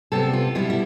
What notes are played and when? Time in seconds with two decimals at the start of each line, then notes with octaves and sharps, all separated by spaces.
0.12 C3 G3 B3 A4
0.33 F4
0.55 B2 G3 B3 E4
0.70 E4